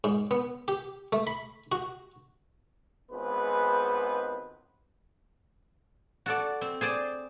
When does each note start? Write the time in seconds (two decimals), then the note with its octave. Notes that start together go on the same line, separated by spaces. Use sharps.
0.04 G#2
0.31 B3
0.68 G4
1.13 A3
1.27 B5
1.72 F#4
3.11 G#1 C#2 G#3 B3 B4 C5
6.26 F#4 A4 D5
6.61 C4
6.81 G#4 C5 D5